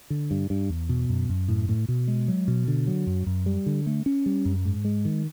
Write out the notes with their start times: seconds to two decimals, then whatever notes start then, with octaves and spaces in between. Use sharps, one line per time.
0.10 D3
0.31 G2
0.50 G2
0.69 E2
0.89 B2
1.09 F#2
1.29 F#2
1.48 A2
1.69 A2
1.88 B2
2.08 G#3
2.28 F#3
2.48 B2
2.68 D3
2.87 F#3
3.07 F#2
3.26 F#2
3.46 G3
3.66 D3
3.86 A3
4.06 C#4
4.26 G3
4.45 F#2
4.65 G#2
4.85 G#3
5.05 D#3